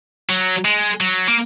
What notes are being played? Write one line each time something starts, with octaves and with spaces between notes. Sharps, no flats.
F#3
G#3
F#3
A#3